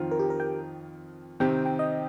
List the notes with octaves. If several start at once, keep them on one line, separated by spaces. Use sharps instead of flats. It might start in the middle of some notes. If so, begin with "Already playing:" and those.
Already playing: F2 D#3 C4 F4
A#4
G4
A#4
G5
C3 D#3 C4 G4 G5
G5
D#5